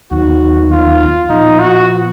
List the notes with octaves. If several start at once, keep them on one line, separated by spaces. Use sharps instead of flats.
D#2 D#3 F#3 B3 D#4 F#4
F4
A#2 F3 B3 D#4 F4
F#4